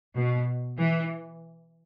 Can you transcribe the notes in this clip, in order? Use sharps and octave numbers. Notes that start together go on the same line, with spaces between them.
B2
E3